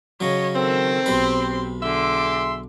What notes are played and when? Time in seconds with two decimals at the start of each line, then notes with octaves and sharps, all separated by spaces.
0.21 C#3 F#3 C#5 D#5
0.56 D#3 C4 A4
1.06 B1 G4 B4 C6
1.83 D3 G#4 E5 C6 D6